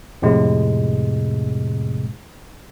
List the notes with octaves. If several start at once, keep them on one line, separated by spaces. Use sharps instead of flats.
F2 A2 C3 G#3